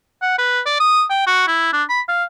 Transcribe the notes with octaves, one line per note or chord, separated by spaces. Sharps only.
F#5
B4
D5
D#6
G5
F#4
E4
D4
B5
F5